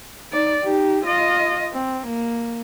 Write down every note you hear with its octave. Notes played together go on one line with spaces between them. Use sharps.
D#4 D5
D#4 G4
F4 D#5
C4
A#3